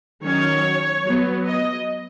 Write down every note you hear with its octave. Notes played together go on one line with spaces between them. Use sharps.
D#3 F#3 C#4 C#5
F#3 B3
D#5